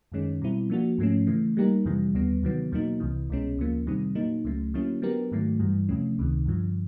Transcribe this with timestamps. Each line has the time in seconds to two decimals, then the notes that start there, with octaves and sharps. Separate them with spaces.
0.12 F#2 D#3 G#3 C#4
0.42 B2 G3 C4 E4
0.70 F3 A#3 D4 F#4
0.98 G#2 F3 A3 C#4
1.27 C#3 E3 A3
1.57 G3 A#3 D#4 G4 A#4
1.85 F2 C3 E3 G3
2.14 D#2 D3 G3 B3
2.43 E2 C3 D#3 F#3 B3
2.72 E2 B2 F#3 A#3 D#4
3.00 C2 C3 E3
3.30 C2 B2 G#3 C#4
3.57 D2 C#3 F3 A#3
3.86 F2 C3 D#3 G3 C4
4.15 A#2 F#3 A#3 D#4
4.45 C#2 C#3 F#3 A3
4.74 D3 F#3 A#3 C#4 E4
5.02 F#3 B3 D4 G4 A#4
5.32 G#2 D#3 F#3 A3
5.59 G2 E3 G3
5.89 E2 C3 F3 A3 C#4
6.18 C#2 C3 D#3
6.46 G2 D3 F3